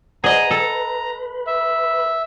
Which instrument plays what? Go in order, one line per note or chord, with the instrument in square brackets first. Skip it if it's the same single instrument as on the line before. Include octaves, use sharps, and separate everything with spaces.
[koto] G#4 D#5 [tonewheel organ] B4 B5 [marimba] C5 D5 F#5 [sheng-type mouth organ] A#5
[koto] A4
[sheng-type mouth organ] E5